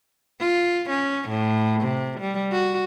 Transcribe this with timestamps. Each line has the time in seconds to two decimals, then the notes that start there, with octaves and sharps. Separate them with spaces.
0.40 F4
0.90 C#4
1.29 A2
1.81 C3
2.20 G3
2.52 F#4